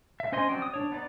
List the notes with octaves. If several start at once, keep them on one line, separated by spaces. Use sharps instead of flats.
E5
C#4 C5 D#5 G#5 C6
F#3 C4 C#4 D5 G5
D#6
D4 C#5
B3 D#4 D5